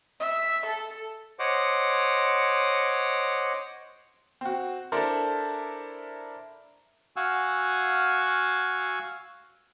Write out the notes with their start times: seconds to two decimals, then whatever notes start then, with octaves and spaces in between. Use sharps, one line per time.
0.20 E5
0.65 A4
1.39 C5 C#5 D#5 F#5 D6
4.41 C4 F#4
4.92 D4 E4 A4 A#4 C5
7.16 F#4 F5 F#5 G#5 E6